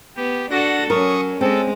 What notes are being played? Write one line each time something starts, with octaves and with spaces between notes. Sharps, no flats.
B3 G4
D4 F#4 A4 F#5 A#6
F#3 C#4 A#4 C#6 D#6
G#3 C4 C#4 A4